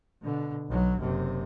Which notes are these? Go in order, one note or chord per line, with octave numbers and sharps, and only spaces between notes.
B2 D3
B1 F#3
F#1 C3